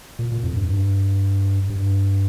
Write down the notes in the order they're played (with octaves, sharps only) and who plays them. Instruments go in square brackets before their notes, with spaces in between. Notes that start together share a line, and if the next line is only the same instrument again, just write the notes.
[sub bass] A#2
A#2
F2
G2
G2
G2